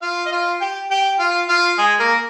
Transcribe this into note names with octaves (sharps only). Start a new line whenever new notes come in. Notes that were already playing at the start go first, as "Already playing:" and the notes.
F4 F5
D#5
F4 F5
G4 G5
G4 G5
F4 F5
F4 F5
G#3 G#4
A#3 A#4